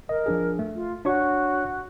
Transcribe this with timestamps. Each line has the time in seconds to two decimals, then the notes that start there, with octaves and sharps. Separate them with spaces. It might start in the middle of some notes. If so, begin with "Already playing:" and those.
0.09 A#4 D#5
0.26 F3 D4 G#4
0.59 A3
0.75 F4
1.05 D4 F#4 C#5 C#6